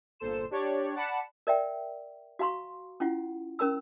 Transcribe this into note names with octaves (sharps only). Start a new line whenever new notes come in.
G1 A#2 A4 C5 E7
D4 G4 C#5 D5
D5 F#5 A5 B5 C#7 E7
A#4 D5 E5 G5
F#4 F5 A#5 C6 C#6
C#4 E4 F4 F#5
C#4 A#4 A#5 E6